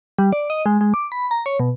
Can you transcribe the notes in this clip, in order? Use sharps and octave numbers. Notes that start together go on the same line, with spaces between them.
G3
D5
D#5
G#3
G#3
D6
B5
A#5
C#5
B2